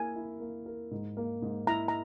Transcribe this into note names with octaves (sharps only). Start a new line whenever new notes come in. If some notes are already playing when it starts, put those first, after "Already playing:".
Already playing: A#3 E4 A#4 G#5
E4
A#3
A#4
G#2
A#3
G#2
E4 A#5
A#5